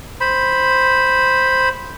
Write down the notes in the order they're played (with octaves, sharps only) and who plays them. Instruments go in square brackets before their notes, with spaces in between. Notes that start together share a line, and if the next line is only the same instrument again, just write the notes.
[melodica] C5 B5